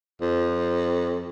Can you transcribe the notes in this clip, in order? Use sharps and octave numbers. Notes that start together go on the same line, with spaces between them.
F2